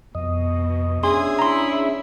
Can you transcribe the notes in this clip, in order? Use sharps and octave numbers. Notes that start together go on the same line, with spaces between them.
F2 B2 D#5
C#4 D4 G#4 E5 C6
E4 A#5 C6